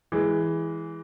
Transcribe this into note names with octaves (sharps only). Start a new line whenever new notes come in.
E3 G#3